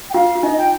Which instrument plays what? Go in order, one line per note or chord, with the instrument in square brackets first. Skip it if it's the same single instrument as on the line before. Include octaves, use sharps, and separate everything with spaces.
[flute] G5
[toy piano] F4 [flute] F5
[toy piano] F4
[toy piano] D#4 [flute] D#5
[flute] G5